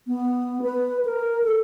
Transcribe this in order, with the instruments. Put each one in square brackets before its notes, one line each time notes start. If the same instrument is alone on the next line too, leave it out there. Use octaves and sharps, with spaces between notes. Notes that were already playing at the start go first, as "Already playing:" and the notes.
[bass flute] B3
B4
A#4
A4